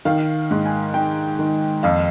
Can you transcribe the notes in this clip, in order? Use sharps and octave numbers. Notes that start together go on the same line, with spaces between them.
D#3 F5
G#2
G#5
D#3 G5
D#3
F2 F5